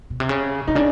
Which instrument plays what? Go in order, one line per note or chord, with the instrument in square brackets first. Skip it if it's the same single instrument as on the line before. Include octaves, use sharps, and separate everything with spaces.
[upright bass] B2
C3
C#3
[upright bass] C3 [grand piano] D#4
[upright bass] C#3 [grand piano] D4